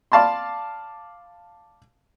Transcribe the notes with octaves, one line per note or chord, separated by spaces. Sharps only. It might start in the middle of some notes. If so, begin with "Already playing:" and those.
D5 F5 A5 B5 C6